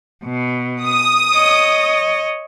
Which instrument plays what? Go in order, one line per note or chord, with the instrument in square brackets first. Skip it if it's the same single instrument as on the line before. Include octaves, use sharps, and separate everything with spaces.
[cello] B2
[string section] D#6
[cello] C#5 D#5